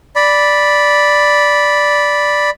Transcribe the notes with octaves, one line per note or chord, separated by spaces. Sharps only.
D5 B5